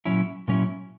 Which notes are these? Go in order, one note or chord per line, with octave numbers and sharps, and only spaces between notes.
A#2 F#3 C#4 E4
A#2 F#3 C#4 E4